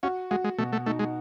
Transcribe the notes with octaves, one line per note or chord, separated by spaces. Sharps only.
C#4 F#4
G#3 F#4
G#3
B2 A3
A3
A3 D#4
G#3